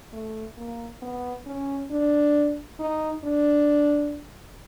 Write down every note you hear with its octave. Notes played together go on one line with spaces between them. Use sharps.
A3
A#3
B3
C#4
D4
D#4
D4